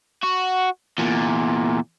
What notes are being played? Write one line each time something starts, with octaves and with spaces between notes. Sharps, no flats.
F#4
E2 A#2